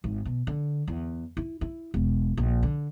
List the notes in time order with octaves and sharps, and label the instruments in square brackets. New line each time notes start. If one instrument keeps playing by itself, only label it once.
[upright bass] G#1
B2
D3
E2
E4
E4
E1
A#1
D3